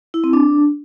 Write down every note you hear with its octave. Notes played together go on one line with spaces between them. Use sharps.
E4
C4
D4